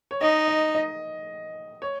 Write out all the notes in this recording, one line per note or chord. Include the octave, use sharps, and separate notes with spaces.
C#5
D#4 D#5
D#5
D#5
C#5